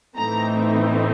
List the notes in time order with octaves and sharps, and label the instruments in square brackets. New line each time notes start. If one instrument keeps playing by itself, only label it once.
[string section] A2 E3 A3 C4 D#4 A#5